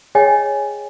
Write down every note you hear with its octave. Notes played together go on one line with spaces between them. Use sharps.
G#4 C#5 D#5 G5 G#5